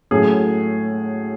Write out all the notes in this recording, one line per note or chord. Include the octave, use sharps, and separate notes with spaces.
A2 F#3 A3 C#4 G#4